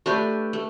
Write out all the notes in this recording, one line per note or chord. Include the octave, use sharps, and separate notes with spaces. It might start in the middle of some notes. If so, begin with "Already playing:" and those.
A3 D4 G4 B4
A3